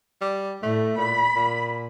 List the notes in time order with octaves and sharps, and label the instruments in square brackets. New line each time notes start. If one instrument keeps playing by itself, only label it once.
[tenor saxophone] G3
[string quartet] A2 [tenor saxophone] A3
[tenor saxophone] A#2 [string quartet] B5
[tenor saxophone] A#2